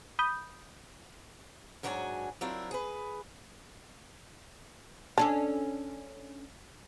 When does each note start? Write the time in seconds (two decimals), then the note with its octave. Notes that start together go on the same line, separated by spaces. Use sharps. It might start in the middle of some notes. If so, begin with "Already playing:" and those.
0.19 B5 D#6 G6
1.83 G#2 F#3 D4 F#4 A#4 G#5
2.41 F#3 C4 D4 E4 F4 A#4
2.71 G#4 B4
5.18 C#4 D4 A4 A5